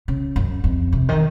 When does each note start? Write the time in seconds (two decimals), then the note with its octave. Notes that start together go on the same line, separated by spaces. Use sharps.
0.08 C#3
0.36 F#2
0.64 F2
0.92 C3
1.09 D#3